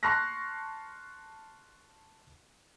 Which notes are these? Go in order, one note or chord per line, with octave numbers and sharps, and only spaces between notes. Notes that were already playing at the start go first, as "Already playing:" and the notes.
A5 C6 C#6 F6 F#6 A#6